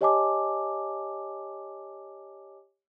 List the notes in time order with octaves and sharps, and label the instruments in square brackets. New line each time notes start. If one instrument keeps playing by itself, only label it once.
[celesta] G4 C#5 D#5 G#5 A5 D6